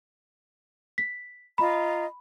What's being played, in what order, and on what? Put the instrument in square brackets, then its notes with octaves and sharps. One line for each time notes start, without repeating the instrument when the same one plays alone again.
[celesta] B6
[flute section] F4 D#5 A#5 [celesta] B5